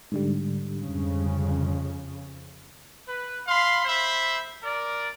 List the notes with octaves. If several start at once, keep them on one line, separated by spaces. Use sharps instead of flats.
G#2 D3 G3
F2 C#3
B4
F5 B5 C6
C5 E5 B5
A#4 D5